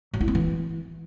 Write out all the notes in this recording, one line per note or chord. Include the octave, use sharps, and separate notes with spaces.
F#3
E4
C4
E3